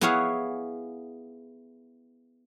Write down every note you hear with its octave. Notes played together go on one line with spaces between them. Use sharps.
B3 E4 G#4 C#5 F5 F#5